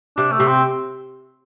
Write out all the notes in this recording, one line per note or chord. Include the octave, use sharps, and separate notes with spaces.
C3 D4
A3
C3
C4